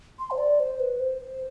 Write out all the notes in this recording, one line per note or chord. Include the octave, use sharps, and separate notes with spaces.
C6
C5
D5
C5
B4
C5